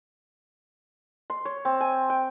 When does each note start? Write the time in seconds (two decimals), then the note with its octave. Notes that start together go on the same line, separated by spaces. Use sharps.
1.30 C6
1.45 C#5
1.65 C4
1.81 G#5
2.10 G5